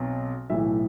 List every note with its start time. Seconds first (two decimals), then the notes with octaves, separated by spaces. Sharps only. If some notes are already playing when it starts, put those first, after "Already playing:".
Already playing: B1 B2 F#3 C4
0.50 B1 A2 E3 E5